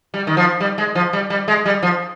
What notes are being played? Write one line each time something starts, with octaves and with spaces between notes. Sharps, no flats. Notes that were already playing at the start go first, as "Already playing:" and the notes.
G3
D#3
F3
G3
G#3
F3
G3
G3
G#3
G3
F3